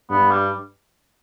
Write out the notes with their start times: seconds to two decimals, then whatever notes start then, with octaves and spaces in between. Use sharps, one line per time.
0.10 G2 B3
0.31 G3